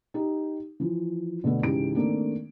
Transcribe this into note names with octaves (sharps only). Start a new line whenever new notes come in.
D#4 G4
E3 F3
B2 D3 A3 B3
C#2 G#2 C#3 E3 G4 D7
D#3 A3 A#3 C4 D4